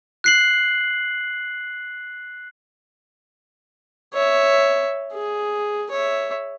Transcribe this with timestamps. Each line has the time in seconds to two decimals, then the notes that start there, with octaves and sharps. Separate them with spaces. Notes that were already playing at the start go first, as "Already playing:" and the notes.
0.24 F#6 C7 F#7
4.14 C#5 E5
5.13 G#4
5.91 C#5 E5